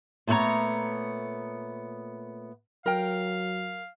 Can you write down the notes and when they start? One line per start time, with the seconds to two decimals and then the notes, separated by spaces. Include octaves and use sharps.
0.27 A#2 A3 B3 C4 C#5 A#5
2.86 F#3 A#4 F5 G5